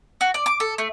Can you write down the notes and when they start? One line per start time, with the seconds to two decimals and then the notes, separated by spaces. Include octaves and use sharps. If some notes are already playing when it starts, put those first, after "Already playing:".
0.21 F#4
0.34 D5
0.46 D6
0.60 A4
0.78 A3